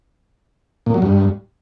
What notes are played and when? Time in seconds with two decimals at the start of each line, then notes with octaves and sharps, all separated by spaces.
0.86 A#2
0.94 F#3
1.02 G2